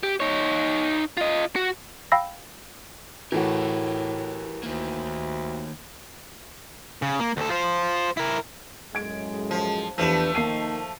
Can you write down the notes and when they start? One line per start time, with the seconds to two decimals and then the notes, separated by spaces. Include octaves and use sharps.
0.03 G4
0.20 D#4 C#5
1.17 F4 D#5
1.56 F#4
2.12 F5 G5 B5 E6 A#6
3.32 A2 E3 A3 F#4 G4 A#4
4.63 D2 D#3 A#3
7.02 C#3
7.20 A#3
7.37 D2 A4
7.49 F4 C5
8.17 E4 A#4
8.95 F#2 A2 G#3 G#6 D7
9.51 F3
9.98 E2 F3 A3 D4 G4 B4 E7
10.35 D#3 A#3 C7 D#7